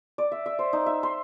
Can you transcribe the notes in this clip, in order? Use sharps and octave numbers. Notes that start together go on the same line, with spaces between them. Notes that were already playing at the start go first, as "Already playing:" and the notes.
D5
E5
E5
C5
D#4
E5
C6